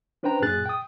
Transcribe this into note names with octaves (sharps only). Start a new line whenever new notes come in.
C#4 D4 B4 C5 G5 A#5
F#2 A#2 G#4 F#6 A6
G5 D#6